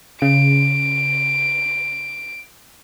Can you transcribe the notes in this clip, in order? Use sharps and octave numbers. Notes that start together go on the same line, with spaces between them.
C#3 D7